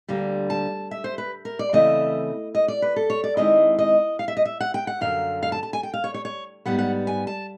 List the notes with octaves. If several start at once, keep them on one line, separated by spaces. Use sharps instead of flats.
D2 D3 G3 A#3
A5
E5
C5
B4
A#4
D5
C#3 E3 A3 C4 D#5
D#5
D5
B4
A4
C#5
D5
D#3 G#3 C4 E4 D#5
D#5
F5
E5
D#5
E5
F#5
G5
F#5
F#2 D3 F#3 F5
F5
A5
A5
G#5
G5
F5
C#5
C#5
C#5
G#2 E3 G3 B3 F#5
F#5
G#5
A5